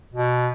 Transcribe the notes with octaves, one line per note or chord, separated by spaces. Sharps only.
B2